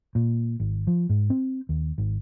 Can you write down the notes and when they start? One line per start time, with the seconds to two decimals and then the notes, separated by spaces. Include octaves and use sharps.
0.15 A#2
0.60 G#1
0.87 F3
1.09 G#2
1.30 C4
1.69 D#2
1.98 G#1